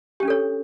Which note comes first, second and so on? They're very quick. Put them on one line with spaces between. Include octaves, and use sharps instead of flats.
G4 C#4 D4 A4 C#5